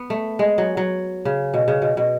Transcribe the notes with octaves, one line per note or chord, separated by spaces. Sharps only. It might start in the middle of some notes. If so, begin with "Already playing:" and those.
Already playing: B3
A3
G#3
F#3
F#3
C#3
B2
C#3
B2
B2